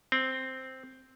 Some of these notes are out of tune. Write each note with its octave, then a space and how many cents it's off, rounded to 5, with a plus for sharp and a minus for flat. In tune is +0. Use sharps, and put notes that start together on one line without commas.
C4 +0